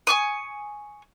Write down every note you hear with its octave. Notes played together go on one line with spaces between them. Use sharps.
G#5 C#6 D#6